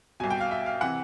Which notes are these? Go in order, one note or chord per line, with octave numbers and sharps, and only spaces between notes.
C2 B2 G#5
G5
F5
E5
F5
C3 E3 F#5